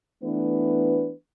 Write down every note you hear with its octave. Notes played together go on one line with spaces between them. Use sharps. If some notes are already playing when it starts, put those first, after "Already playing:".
E3 A3 B3 D4 B4